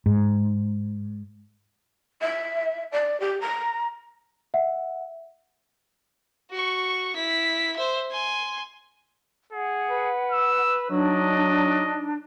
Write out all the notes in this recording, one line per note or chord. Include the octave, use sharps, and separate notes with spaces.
G#2
E5
D5
G4
A#5
E5 F#5
F#4 C#6
E4 B6
C5 E5
G#5 C6
G#4 F#5
B4
E6
F#3 D4 D#4 D#5